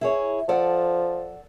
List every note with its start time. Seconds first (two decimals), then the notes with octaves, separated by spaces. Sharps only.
0.01 E4 G#4 C#5
0.49 F3 A4 D5 F#5